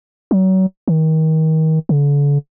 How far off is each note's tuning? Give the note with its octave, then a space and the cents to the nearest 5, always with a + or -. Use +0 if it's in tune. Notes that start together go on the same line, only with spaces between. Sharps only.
F#3 +30
D#3 +30
D3 -40